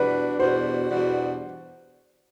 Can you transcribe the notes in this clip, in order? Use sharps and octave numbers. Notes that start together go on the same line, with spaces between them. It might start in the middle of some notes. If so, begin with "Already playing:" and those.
Already playing: E2 B2 G3 D4 F#4 B4
E2 B2 G3 D4 F#4 C5
E2 B2 G3 D4 F#4